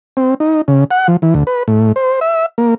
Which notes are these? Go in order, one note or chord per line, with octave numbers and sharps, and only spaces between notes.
C4
D#4
C#3
F#5
F3
E3
D2
B4
A2
C5
E5
A#3